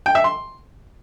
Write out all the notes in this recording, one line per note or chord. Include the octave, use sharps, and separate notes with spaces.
G5
E5
C6